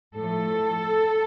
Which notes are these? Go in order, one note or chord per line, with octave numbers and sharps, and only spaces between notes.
A2 F3 A3 A4